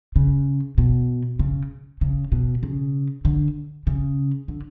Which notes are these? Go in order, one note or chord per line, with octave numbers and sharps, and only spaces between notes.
C#3
B2
C#3
C#3
B2
C#3
D3
C#3
D3